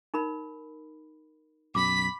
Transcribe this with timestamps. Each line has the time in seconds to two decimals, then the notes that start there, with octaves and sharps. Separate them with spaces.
0.14 D#4 A#4 B5
1.75 B1 F#2 B5 D6 B6